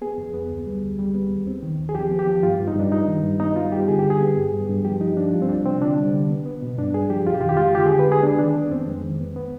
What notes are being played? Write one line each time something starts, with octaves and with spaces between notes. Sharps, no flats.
B3 G#4
F2
B3
D2
G3
D2
G3
B3
D#2
C4
D#3
D#2
G#4
F3 G4
B3
G4
F3
G2 F4
G2
D#4
G2 D4
G2 D#4
D#3
G2
B3 D#4
G3 F4
G3 G4
D3 G#4
D3 G4
G#4
B3
G2
G2
G2
F3 G4
F3 D#4
F3 D4
G3 F4
C4
C2 D4
C3 C4
D3 D4
G3
D3
B3
B3
B2
G2 D4
G2 G#4
F3 G4
F2 F4
G4
D#3 F4
G4
G#3 F4
D3 G4
G#4
D3
B4
G#3 G#4
B3 D4
D#3 D4
B3
F2 C4
G#3
D#3
B3
B3